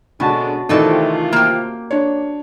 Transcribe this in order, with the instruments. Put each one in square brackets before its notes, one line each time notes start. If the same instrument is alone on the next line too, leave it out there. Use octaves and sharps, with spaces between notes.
[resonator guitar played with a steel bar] B2 [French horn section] D3 G#3 D4 [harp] C#4 F#4 A5
[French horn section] C3 F4 [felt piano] D#3 E3 A3 [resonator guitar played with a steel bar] D#4 A4 D5
[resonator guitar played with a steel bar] A#3 G4
[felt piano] D4 C#5